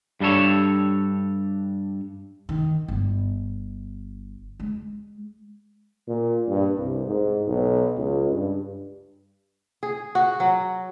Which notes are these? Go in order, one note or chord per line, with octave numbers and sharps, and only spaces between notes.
G2 G3 D4 A4 C#5
D#3
G1
G#3
A#2
G2
C2
G#2
B1
C#2
G2
G#4
F#4
F#3